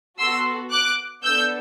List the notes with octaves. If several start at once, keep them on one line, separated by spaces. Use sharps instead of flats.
B3 F#4 A4 C6 E6
D6 F#6
B3 D4 A4 E6 G6